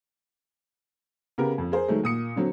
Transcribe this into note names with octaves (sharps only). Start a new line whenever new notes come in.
C#3 B3 G4 A#4
F2
G#4 A#4 C5
D#3 F#3 G#3 A3
A#2 D#6 C#7
D3 F#3 C4